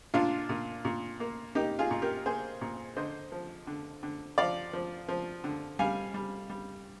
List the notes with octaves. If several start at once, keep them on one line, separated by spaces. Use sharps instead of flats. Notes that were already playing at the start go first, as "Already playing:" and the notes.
A#2 D4 F4
A#2
A#2
A#3
A#3 D#4 G4
F4 G#4
A#2
G4 A#4
A#3 G#4 C5
A#2
D3 C5 D#5
F3
D3
D3
F3 D5 F5
F3
F3
D3
G3 F5 G#5
G3
G3